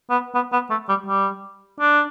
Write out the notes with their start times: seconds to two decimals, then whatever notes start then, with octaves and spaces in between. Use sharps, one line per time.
0.10 B3
0.35 B3
0.52 B3
0.70 A3
0.89 G3
1.07 G3
1.80 D4